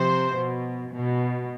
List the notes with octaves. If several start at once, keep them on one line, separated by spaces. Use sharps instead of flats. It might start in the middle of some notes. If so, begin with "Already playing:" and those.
Already playing: C3 F3 C5
B2
B2